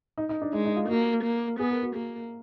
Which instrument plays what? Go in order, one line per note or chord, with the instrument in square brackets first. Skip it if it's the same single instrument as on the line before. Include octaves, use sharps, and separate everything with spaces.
[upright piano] D#4
D#4
D4
[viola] G#3 [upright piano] D#4
[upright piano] D#4
F4
[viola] A#3 [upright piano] F#4
[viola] A#3
[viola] B3 [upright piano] G#4
[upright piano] A#4
F#4
[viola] A#3 [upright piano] G#4